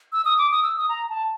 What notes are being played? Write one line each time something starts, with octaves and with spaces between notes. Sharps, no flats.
E6
D#6
D6
D#6
E6
D#6
A#5
A5